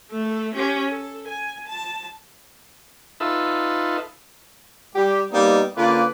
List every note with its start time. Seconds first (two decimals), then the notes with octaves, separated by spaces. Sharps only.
0.11 A3 A4
0.55 C#4 G4
0.90 A4
1.28 G#5
1.67 A5
3.20 D#4 F4 A4 B4 E5
4.96 G3 G4
5.32 G3 A#3 B3 D#4
5.76 D3 A#3 C#4 F4 B4 D5